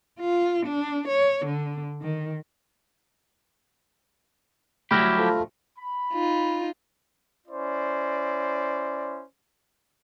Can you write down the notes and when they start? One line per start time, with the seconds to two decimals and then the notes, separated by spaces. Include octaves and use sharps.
0.20 F4
0.66 D4
1.08 C#5
1.46 D3
2.02 D#3
4.91 D2 G2 F#3 E4 G4 B5 F6 A#6
5.16 F3 A3
5.78 B5
6.13 D#4 F4
7.47 C#4 E4 C5 D5